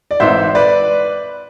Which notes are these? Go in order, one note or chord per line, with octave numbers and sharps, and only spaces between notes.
D5
G#1 G#2 E3 C5 E5
B4 D5